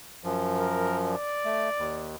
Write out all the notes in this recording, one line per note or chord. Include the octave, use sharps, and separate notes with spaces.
F#2 F3
A#4
D5
A3
D#2